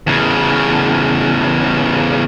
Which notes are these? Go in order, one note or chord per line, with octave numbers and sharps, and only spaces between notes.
E2 C#3